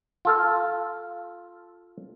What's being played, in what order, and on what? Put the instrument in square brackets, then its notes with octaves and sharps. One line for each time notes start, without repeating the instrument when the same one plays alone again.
[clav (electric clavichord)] F4 A4 F5